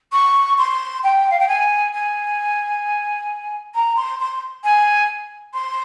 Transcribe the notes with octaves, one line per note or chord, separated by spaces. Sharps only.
C#6
C6
G5
F5
G5
G#5
G#5
A#5
C6
C6
G#5
C6